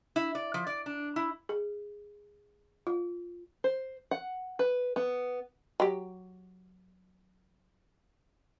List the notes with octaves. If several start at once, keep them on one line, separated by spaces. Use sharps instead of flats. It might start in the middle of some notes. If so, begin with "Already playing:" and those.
E4
D5
F3
D5
D4
E4
G#4
F4
C5
F#5
B4
B3
F#3 G4